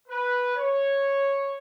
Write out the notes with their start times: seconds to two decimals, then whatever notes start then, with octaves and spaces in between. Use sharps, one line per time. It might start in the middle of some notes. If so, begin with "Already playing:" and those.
0.08 B4
0.55 C#5